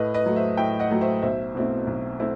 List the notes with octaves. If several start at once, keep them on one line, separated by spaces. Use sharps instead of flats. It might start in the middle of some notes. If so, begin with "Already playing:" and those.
Already playing: A2 B4 D#5
B4 D#5
F#3 A3
C5 E5
A2 E5 G5
D#5 F#5
F#3 A3
C5 E5
B1 C5 E5
B2 A3 C4 E4
B1
A3 C4 E4